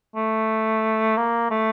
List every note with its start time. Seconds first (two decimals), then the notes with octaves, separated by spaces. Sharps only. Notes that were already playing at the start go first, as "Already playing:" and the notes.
0.16 A3
1.17 A#3
1.51 A3